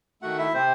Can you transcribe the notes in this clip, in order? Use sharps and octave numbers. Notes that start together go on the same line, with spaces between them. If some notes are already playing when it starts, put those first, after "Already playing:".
D#3 A3 F#4 F#5
E4 E5
C3 C4 C5